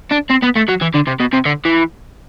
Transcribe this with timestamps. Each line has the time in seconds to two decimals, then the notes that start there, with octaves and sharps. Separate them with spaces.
0.12 D4
0.30 C4
0.43 B3
0.56 A3
0.69 F#3
0.82 E3
0.95 D3
1.07 C3
1.20 B2
1.33 C3
1.46 D3
1.65 E3